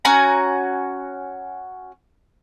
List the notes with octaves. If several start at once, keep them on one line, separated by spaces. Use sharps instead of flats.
C#4 F#4 G#5 A#5